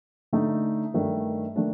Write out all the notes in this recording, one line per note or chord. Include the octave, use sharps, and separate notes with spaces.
D3 A3 D#4
G2 D#3 A3 D4
D#3 A3 D4